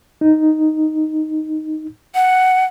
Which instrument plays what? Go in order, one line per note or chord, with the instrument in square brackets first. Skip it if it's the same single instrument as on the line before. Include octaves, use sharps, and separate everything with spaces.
[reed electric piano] D#4
[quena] F#5